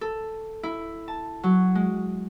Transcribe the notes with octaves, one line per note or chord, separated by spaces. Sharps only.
A4
E4
A5
F#3
G#3